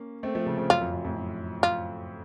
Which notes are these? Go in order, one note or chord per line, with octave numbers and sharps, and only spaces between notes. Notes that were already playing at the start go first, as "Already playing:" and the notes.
Already playing: A#3 C#4
A3 C4
F3 A3
C#3 F3
C#3 F3
F#2 F4
F2
F#2
F2 A2
F#2
F4